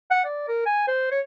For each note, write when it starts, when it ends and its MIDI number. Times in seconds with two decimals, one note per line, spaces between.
0.11 0.22 78
0.25 0.45 74
0.48 0.63 70
0.66 0.85 80
0.87 1.10 72
1.11 1.20 73